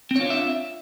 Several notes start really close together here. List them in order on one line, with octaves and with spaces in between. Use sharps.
C4 C#5 F4 D4 E5